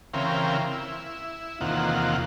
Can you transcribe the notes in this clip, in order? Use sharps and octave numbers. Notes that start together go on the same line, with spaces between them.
C#3 E3 C4 A#4 F5 G5
E4
E2 C3 D#3 A#3 F4 F#5